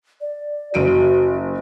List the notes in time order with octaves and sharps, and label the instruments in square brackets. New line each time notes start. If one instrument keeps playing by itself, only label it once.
[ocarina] D5
[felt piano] F#1 D7 D#7 [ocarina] F#4